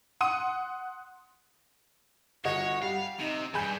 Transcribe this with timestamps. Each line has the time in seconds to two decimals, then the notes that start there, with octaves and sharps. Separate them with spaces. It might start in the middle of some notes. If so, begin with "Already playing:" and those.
0.21 F#5 C6 D#6 D#7
2.45 G1 F#4 C#5 D#5 F#5
2.82 G3 F5
3.19 C3 D#4 F7
3.54 E2 G2 G#4 G#5 B5 G6